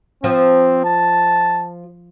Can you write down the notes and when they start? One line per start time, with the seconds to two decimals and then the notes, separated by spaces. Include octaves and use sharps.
0.24 F3 C4
0.85 A5